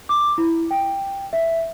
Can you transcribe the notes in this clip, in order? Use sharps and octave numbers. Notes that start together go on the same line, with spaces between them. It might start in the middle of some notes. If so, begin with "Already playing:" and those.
D6
E4
G5
E5